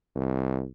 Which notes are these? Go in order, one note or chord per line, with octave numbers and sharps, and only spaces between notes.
C2